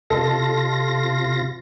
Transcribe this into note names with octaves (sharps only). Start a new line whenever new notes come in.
C3 F4 A4 D#5 A#6